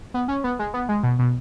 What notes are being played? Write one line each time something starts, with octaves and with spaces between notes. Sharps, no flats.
B3
C#4
B3
G#3
B3
G#3
B2
B2